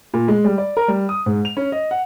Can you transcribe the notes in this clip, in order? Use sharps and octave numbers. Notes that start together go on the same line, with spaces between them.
A#2
G#3
G3
D5
A#4
G3
D#6
G#2
F7
C#4
D#5
F#5